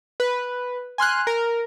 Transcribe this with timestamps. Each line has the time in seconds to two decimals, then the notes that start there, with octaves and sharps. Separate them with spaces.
0.20 B4
0.98 G#5 C6 F6 F#6
1.27 A#4